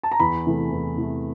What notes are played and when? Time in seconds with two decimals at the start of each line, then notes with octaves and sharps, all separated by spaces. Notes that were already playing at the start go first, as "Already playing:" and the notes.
0.03 A5
0.12 A#5
0.20 E2 B5
0.45 C3 E3 A3
0.71 E2
0.97 C3 E3 A3